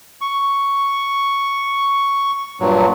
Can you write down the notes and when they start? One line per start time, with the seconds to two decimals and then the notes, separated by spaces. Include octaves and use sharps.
0.21 C#6
2.60 G2 A#2 F#3